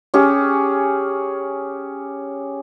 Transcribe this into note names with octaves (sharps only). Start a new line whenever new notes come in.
C#4 G4 G#4